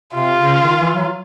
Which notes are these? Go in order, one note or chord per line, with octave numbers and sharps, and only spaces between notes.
C3 F4
C#3
D#3
E3
F#3